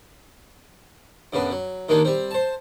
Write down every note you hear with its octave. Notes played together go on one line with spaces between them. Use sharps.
F#2 C#3 B3 D4
F#3
D#2 D#3 G#3 A#3 D4
G3 C4
C5 A5